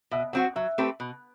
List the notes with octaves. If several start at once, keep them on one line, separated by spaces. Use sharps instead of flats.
B2 E5
F#3 C4 F#4 F#5
F#3 E5
A3 C4 G4 B4
B2